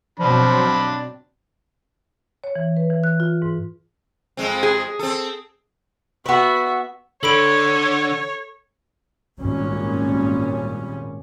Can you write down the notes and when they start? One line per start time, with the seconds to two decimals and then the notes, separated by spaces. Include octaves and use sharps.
0.20 B2 F3 F#3 C4 D4 B5
2.44 C#5
2.56 E3
2.77 B4
2.90 E3
3.04 F#6
3.20 F4
3.42 G#2
4.37 F2 G#3 C4
4.63 G#4
4.99 C4 A4
6.26 B3 F#4 B4 E5
7.23 D3 A4 C#5 B5 D7
9.38 G#1 A#2 G3 C#4